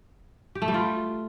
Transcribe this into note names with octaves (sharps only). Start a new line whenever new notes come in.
G4
A3
G3
F4